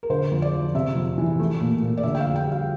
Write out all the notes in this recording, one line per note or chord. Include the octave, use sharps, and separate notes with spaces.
A#4
D3 C5
F2
D5
F3
C3 E5
F2
E3
A3
A#2
A#2
D5
D3 E5
G5
F5
F2
G5
G3
F5